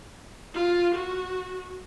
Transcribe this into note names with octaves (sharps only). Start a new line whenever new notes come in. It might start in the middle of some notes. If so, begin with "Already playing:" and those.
F4
F#4